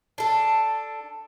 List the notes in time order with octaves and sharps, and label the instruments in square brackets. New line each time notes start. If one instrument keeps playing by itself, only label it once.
[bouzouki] D4 A4